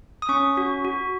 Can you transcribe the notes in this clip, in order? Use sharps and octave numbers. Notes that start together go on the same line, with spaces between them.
D#6
C#4 C#6
F#4
F#4